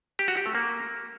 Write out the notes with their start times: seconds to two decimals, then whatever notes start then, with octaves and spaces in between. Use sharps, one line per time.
0.19 G4
0.28 F#4
0.37 G4
0.46 A3
0.55 A#3